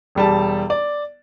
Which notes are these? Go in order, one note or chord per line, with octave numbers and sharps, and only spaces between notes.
E1 G3 A5
D5